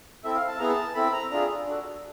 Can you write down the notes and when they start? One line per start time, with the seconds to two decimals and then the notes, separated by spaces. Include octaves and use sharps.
0.24 C4 E4 A4 E5
0.35 F5
0.48 A5
0.59 B3 E4 G#4 A#5
0.69 A5
0.95 C4 E4 A4 B5
1.13 A#5
1.31 D4 F4 G#4 A#5
1.66 D4 F#4 A4